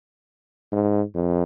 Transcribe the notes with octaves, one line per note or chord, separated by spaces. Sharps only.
G#2
F2